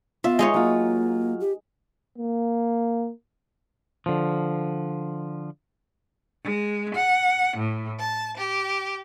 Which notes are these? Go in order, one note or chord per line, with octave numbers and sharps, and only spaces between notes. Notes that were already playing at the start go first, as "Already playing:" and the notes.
B3 F4 E5
G#3 D#4 C#5
F#3 A#3 F4
G4
A#3
D3 F3
G#3
F#5
A2
A5
G4